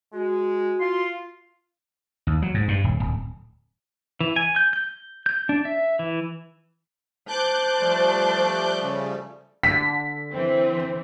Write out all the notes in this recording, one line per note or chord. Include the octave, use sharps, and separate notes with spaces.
G#3 F#4
F4 C6
D#2
F#3
G#2
G2
D#1
D1
E3
G#5
G6
G6
G6
D4
E5
E3
C5 A5 D6 F#6 G6
F3 G3 A3
C#3
D3 B6
E3 C4